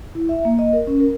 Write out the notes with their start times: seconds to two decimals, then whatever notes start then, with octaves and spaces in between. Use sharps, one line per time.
0.15 E4
0.29 E5
0.45 A#3
0.59 D#5
0.73 A#4
0.87 C#4
1.00 A#4